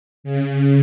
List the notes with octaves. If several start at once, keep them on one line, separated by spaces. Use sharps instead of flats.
C#3